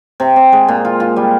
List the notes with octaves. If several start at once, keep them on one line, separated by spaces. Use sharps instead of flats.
C3
C3
G#3
A#2
F4
F4
G3